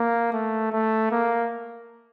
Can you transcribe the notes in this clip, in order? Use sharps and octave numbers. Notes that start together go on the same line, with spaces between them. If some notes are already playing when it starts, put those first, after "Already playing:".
Already playing: A#3
A3
A3
A#3